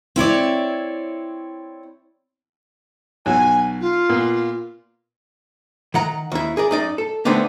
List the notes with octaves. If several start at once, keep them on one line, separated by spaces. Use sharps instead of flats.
C4 E4 C#5 D5
B1 F#4 C#5 G#5
F4
A#2 B3
D#3 F#5 A#5
D#2 E4
G#4 A#4 D5
F#2 D#4 D5
A4
D3 A3 B3 C4 D4 D#4